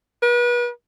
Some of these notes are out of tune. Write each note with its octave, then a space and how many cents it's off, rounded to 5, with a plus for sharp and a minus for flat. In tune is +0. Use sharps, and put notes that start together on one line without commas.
B4 -35